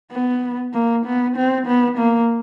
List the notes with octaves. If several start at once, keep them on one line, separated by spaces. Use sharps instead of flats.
B3
A#3
B3
C4
B3
A#3